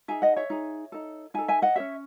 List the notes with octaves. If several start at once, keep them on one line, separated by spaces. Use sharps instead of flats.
D#4 G#4 E5 G#5
D#5 F#5
C#5 E5
D#4 G#4
D#4 A4
D#4 A4 E5 G#5
E5 G#5
D#5 F#5
C#4 G#4 C#5 E5